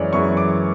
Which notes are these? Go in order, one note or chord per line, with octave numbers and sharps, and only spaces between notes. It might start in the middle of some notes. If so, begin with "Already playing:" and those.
Already playing: F#2 E3 G#3 C#5 D5
F#2 E3 G#3 C#6
D6